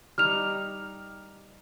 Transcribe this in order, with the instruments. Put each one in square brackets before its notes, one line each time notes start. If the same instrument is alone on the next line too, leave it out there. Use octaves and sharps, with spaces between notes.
[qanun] G3 D#4 [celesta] F6 F7